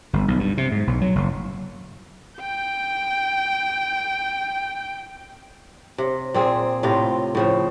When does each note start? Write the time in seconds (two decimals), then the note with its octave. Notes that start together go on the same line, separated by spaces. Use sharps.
0.13 G1
0.28 B1
0.39 G2
0.58 C3
0.72 G#2
0.87 B1
1.01 F#3
1.15 F#1
2.40 G5 G6
5.98 C3
6.34 A#2 C4 G#4
6.83 A2 C3 F4
7.35 A2 C#3 F3